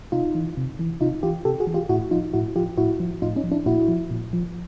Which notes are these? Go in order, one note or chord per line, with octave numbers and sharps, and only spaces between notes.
C3 D#4 F4
E3
C3
E3
C3 D#4 F4
E3 F4 G4
C3 G4 A4
F#4 G#4
E3
F4 G4
A2 E4 F#4
F3 D#4 F4
A2 E4 F#4
F3 F4 G4
A2 E4 F#4
F3
A2 D#4 F4
C#4 D#4
F3
D4 E4
A#2 E4 F#4
F3
A#2
F3